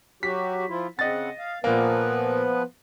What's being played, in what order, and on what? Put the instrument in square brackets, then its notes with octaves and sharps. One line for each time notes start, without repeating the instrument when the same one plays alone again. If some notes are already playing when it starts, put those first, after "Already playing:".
[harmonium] F#3 F#4 G4 [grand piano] B6
[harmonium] F3 E4 F4
[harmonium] C#3 C4 F#5 [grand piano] D#5 A6
[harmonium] F5
[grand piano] A#2 A#3 [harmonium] F3 B3 B4